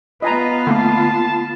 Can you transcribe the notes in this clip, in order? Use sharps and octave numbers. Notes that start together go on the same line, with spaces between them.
B3 F4 B4 D#5 G#5 A#5
D3 A3 A#3 A5